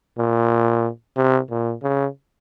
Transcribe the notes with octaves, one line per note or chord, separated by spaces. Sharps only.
A#2
C3
A#2
C#3